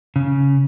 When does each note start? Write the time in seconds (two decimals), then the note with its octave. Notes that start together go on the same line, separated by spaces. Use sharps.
0.16 C#3